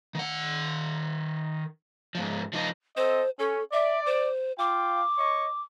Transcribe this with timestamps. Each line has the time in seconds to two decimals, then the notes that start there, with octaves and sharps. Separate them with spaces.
0.15 D#3 F#5
2.15 G#2 F3
2.53 F3 D#4
2.97 C4 A4 C5 D#5
3.39 C#4 A4
3.72 D5 E5
4.06 C5
4.59 F4 F5 G5 D6
5.18 C#5 D#5 C#6